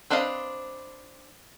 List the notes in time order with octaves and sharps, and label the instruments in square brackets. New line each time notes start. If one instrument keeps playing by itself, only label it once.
[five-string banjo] C4 D4 B4 D#5 F5